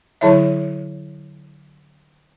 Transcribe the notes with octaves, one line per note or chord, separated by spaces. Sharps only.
D3 F#3 E4 C#5 E5